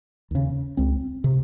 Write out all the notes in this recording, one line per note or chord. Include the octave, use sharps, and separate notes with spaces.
D#2 C#3
C#2 C4
C3